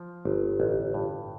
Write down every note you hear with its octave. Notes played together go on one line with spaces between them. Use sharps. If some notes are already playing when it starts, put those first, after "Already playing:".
Already playing: F3
G1
A1
G2